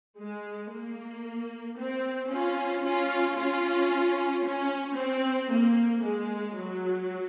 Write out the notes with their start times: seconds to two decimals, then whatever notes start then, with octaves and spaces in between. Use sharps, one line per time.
0.18 G#3
0.71 A#3
1.77 C4
2.31 C#4 F4
2.84 C#4 F4
3.37 C#4 F4
4.44 C#4
4.97 C4
5.50 A#3
6.03 G#3
6.57 F#3